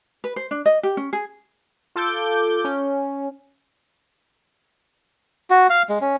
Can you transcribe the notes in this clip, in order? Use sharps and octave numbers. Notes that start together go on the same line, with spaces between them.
B4
C5
D4
D#5
G4
C#4
G#4
F4 A4 D6 G6
C#4
F#4
F5
G#3
C#4